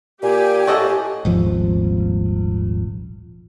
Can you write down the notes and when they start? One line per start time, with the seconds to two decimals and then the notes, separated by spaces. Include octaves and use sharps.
0.23 A#2 G4 G#5
0.67 A2 F#4 A4 D#5
1.25 D#1 G#1 F3